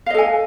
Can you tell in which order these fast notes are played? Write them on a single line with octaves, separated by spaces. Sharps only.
F5 D#5 A4 G#5